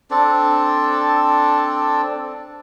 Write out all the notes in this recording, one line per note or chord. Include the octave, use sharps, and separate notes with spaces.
C4 D4 A4